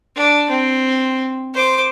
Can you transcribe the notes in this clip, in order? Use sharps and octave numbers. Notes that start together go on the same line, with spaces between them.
D4
C4
C5 D6